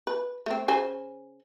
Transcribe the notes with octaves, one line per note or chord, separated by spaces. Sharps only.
B4
A3 C4
C#3 C5 G#5